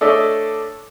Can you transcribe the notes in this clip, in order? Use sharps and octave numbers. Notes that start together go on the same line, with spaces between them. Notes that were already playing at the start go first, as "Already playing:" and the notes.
A3 D4 A4 C#5 D#5 E5